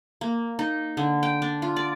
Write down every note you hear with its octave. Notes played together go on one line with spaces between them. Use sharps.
A#3
D#4
D3
G5
D4
F4
D5